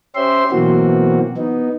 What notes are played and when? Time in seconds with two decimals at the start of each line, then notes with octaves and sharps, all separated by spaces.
0.15 C#4 G4 C5 E5 C6
0.52 B2 E3 F#3 A#3 C4 F#4
1.37 B3 D#4